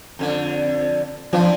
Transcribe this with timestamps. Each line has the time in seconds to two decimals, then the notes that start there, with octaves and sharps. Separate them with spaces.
0.19 F2 D3
1.33 E3 F3 C4 D4